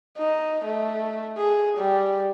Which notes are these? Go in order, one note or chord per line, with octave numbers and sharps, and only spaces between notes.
D#4
A3
G#4
G3